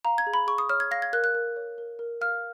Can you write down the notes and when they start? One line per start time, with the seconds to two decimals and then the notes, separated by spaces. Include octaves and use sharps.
0.05 F5 A#5
0.18 G#6
0.27 G#4
0.34 B5
0.47 G#4 C#6
0.58 D#6
0.69 C#5 F6
0.80 G#6
0.91 F5 A#6
1.02 G#6
1.13 A#4 F#6
1.24 F#6
1.35 A#4
1.56 C#5
1.78 A#4
1.99 A#4
2.21 F5 F6